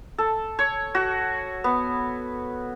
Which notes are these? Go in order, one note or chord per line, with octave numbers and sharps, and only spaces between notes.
A4
C#5
F#4
B3